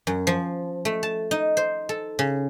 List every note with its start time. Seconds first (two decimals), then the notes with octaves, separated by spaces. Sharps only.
0.07 F#2
0.27 F3
0.85 A3
1.03 A5
1.31 D#4
1.57 C5
1.89 A4
2.19 C#3